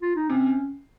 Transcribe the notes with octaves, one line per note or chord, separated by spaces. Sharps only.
F4
D#4
C3 C#4